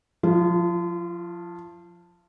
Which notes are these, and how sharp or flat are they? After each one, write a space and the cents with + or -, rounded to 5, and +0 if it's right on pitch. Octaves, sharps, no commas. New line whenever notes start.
F3 +20 F4 -35